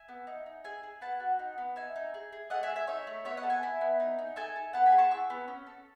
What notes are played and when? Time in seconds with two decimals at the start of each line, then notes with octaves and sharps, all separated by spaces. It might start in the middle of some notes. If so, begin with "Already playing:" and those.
Already playing: E5 G#5
0.08 B3
0.27 D#4
0.46 D#4
0.64 G#4 E5 G#5
0.83 G#4
1.01 B3 F#5 A5
1.20 F#4
1.39 D#4
1.58 B3
1.76 D#4 E5 G#5
1.96 D#4
2.14 G#4
2.33 G#4
2.50 A3 D#5 F#5
2.63 E5 G#5
2.70 G#4
2.76 E5 G#5
2.87 D#4 C#5 E5
3.07 A3
3.25 B3 C#5 E5
3.37 D#5 F#5
3.43 A4
3.50 E5 G#5
3.63 E4
3.81 B3
4.00 D#4
4.19 D#4
4.36 A4 E5 G#5
4.56 A4
4.73 B3 F#5 A5
4.86 G#5 B5
4.92 G#4
4.98 A5 C#6
5.11 E4 C#6 E6
5.30 B3
5.48 C#4
5.67 A4